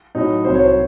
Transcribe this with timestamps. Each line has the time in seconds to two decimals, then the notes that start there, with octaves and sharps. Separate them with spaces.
0.15 A2 F#3 D#4
0.44 C2 C3 F#3 C5
0.54 C#5
0.64 C5